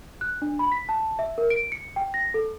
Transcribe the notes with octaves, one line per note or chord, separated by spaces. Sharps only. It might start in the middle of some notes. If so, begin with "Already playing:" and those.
F#6
D4
B5
B6
A5
E5
A#4
D7
C#7
G5
A#6
A4